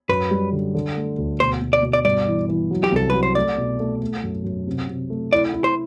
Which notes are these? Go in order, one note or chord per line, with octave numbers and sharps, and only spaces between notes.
F#2 B4
G3
D3
D3
A3
D2
B2 C5
B2
D5
B2
D5
G2 D5
E3
E3
F#3
G4
C2 A4
F#3 B4
C5
A3 D5
B2
A3
A3
F#2
F#2
C3
C3
A3
E4 D5
E4
C5